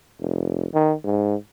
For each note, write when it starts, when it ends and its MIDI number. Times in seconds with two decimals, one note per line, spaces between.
0.20 0.67 29
0.74 0.93 51
1.04 1.35 44